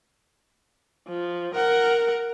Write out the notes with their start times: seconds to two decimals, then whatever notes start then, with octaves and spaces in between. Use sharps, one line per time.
1.08 F3
1.55 A#4 F#5